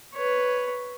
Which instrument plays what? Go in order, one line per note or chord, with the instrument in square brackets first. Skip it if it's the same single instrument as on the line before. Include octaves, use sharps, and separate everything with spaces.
[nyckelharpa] B4 C#5